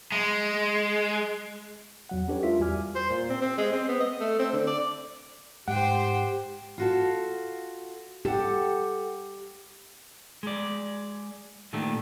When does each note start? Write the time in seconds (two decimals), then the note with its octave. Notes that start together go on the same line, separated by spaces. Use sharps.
0.12 G#3
2.09 E2 F#3 F#5
2.28 C#4 D4 G4 A4 B4 C#5
2.43 G#3 E4 F4 A#4 E5 B6
2.60 E2 G3 F#4 G#5 D6 F6
2.95 C5
3.10 A#2
3.30 C4
3.41 C4
3.58 G#3
3.72 C4
3.88 B3
4.00 D#5
4.20 A3
4.39 C4
4.53 D3
4.67 D5
5.68 G#2 G4 C5 F#5 G5
6.78 F4 F#4 A4
8.25 G4 A4 F#5
10.43 G#3 D5
11.73 A#2 D#3 A3 D4 G4